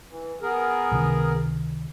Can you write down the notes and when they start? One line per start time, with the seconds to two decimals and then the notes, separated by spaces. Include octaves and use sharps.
0.09 E3
0.42 B3 G#4 A#4
0.91 C#2 C3 D#3